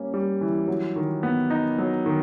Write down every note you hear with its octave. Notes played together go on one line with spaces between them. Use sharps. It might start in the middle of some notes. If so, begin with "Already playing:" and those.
Already playing: G3 A#3 C#4
G3
E3
F#3
D#3
B3
D#4
F#3
D#3